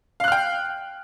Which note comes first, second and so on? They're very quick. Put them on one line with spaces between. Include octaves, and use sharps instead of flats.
F5 F#6 F6 G5